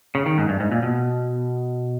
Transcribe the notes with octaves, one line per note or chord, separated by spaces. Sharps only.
C#3
D#3
G#2
G2
G#2
A#2
B2